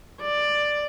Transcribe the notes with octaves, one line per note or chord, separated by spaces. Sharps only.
D5